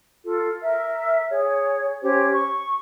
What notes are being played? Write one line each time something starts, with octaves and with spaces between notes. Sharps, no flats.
F4 A4
A#4 E5
G#4 C#5
C#4 G4 C5 C#5
C#6